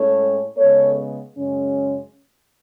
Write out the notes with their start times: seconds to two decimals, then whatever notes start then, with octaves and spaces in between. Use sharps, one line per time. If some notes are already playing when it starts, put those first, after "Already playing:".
Already playing: A2 G#3 C#4 A4 C#5
0.57 C#3 G#3 B3 A4 C#5
1.36 F#2 C#3 G#3 C#4